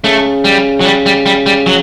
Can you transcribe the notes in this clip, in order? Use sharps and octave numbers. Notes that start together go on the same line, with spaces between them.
C#3 A3
G3
F#3
G3
G3
G3
G3
F#3